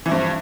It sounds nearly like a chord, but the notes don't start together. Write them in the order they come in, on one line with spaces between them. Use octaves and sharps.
E3 F3 G2